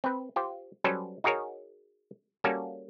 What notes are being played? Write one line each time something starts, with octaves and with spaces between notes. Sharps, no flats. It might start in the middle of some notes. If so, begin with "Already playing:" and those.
C4 B4
F4 G4 C5
F#3 G3 C#4 A4 B4 C5
D#4 F#4 G#4 A#4 C#5
G3 A#3 C#4 F#4 A4